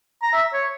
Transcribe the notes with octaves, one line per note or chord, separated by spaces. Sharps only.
A#5
E5
C#5